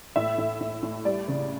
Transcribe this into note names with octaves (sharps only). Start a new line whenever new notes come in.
A2 E5
A2
A2
A2
G3 D5
C#3